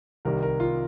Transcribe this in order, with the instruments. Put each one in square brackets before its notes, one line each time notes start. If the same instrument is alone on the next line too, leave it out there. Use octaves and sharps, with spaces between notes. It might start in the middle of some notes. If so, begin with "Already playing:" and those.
[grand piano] C2 C3 D#3 G3 A#4
A#4
F4